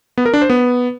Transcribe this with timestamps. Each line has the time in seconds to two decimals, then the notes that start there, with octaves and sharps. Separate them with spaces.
0.18 B3
0.26 A#4
0.34 D4
0.42 C5
0.50 B3